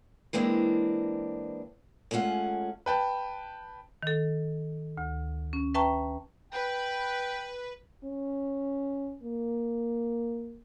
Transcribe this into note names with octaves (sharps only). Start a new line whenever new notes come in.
E3 G#3 A#3 C4 D4
G#3 A3 C#4 F4 F#5
B4 G5 A5
D#3 A4
D2
C#4
B4 E5 G5 A5 A#5 C#6
B4 G5
C#4
A#3